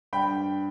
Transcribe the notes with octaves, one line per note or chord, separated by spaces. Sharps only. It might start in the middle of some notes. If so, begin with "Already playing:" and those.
G2 G5 B5